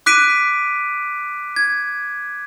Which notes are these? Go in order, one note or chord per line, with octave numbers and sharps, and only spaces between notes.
D6 F#6 B6 D7 D#7
G#6